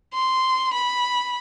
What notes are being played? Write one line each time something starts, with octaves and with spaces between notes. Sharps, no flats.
C6
B5